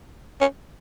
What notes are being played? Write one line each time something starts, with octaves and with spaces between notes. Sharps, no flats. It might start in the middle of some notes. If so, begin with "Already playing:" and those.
C#4